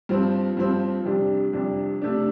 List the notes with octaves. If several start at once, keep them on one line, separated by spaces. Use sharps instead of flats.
G2 F3 C4
G2 F3 C4
F2 C3 G3 D4
F2 C3 G3 D4
C3 A3 D4